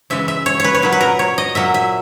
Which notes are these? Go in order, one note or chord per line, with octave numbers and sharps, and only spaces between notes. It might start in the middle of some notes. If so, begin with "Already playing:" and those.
C#3 E3 G#3 E5
E5
C#5
B4 C#5
C#5
A#2 F#3 B4
B4
A#4
C#5
D#5
A#2 F#3 E5
E5